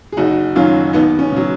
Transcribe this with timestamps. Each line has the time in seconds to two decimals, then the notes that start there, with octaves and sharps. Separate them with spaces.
0.12 G#4
0.17 F#1 D#4 F#4
0.55 F#2 D#3 F#3 C#4 F4
0.93 D#2 B3 D#4
1.19 C#4
1.32 C#3 F#3